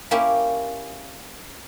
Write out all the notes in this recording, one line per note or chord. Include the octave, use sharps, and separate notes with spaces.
A#3 C#4 E4 G4